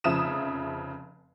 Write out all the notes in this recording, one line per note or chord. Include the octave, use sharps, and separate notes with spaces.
F1 C#3 F3 E5 D#6 E7